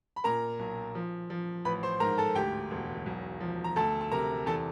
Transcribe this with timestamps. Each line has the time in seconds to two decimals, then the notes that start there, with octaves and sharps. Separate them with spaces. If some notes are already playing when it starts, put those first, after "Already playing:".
0.16 B5
0.24 A#2 A#4 A#5
0.59 B1
0.95 F3
1.30 F3
1.65 A1 B4 B5
1.83 C5 C6
2.00 G#2 A#4 A#5
2.18 A4 A5
2.35 D2 G4 G5
2.71 E1
3.06 B1
3.41 F3
3.64 A#5
3.76 D2 A4 A5
4.01 A5
4.12 C3 A#4 A#5
4.46 E2 A4 A5